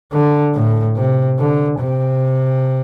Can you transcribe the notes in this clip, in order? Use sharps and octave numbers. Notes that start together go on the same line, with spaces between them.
D3
A2
C3
D3
C3